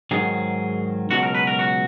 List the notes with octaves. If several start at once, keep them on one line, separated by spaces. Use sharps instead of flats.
G#2 D#3 F#3 G#4
C#2 B2 F#3 F#4
A#4
B4
A#4
F#4